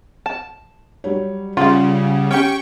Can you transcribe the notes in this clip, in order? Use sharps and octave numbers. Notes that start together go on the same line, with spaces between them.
A5
F#3 G3 C#5
C#3 G3 F4 G#4 F5 F#5
C#4 G4 G5 C#6